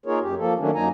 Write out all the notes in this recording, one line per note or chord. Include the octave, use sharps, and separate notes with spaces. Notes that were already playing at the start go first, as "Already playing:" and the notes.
A#3 D#4 F4 G#4 A#4 C#5
F#2 G4
F3 A#3 A4
D#3 F#3 A3 A#3 C#4 D4
F#2 F#3 A#3 D#4 G#5 A#5